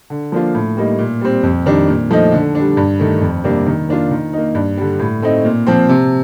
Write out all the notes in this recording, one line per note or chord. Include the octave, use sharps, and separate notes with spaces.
D3
F3 A#3 D4 F4
A2
G3 A#3 D#4
A#2
G3 C4
F2
D#3 G3 D4
A#2
F3 A3 D#4
D3
G3 D4
G2
D#3 A3
F2
C3 G3 A#3 D4
D#3
A#3 D4 F4
D#3
A#3 D#4
G2
D3 G3
A2
A3 C4 D#4
A#2
F3 C4
C3